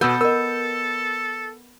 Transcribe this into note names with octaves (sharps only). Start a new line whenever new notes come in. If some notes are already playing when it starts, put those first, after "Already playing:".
B2 B3 A4 E6 G6
A#4 D#5 E6